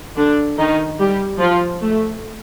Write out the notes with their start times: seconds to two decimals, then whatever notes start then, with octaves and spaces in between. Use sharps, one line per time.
0.16 D3 D4
0.58 D#3 D#4
0.99 G3 G4
1.40 F3 F4
1.81 A3